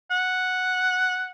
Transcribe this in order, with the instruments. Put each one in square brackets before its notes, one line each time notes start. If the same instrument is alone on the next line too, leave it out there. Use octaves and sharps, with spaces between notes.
[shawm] F#5